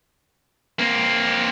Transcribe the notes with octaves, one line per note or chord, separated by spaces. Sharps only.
A#3 C4